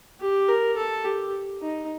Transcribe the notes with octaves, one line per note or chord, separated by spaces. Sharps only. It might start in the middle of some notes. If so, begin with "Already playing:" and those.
G4
A#4
A4
G4
D#4